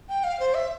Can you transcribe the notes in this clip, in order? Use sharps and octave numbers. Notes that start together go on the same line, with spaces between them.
G5
F5
C5
E5